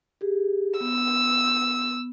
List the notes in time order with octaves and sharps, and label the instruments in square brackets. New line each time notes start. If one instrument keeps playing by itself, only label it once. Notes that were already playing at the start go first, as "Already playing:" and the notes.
[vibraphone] G4 G#4
[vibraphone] B3 [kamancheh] E6